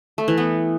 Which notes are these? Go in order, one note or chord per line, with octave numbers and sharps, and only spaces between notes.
A3
E3
B3